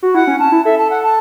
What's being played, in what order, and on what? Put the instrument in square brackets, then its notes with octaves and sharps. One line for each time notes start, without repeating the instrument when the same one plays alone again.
[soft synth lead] F#4
[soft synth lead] E4 [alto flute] F#5
[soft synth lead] C#4
[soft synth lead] C#4 [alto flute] A5
[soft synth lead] E4
[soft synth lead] A4 [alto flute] E5
[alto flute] A5
F#5
A5